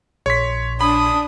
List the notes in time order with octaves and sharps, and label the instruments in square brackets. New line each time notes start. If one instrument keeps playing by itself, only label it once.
[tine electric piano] A#1 A#2 C6 [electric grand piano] C#5 B6
[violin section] D4 [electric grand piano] B5 [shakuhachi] D#6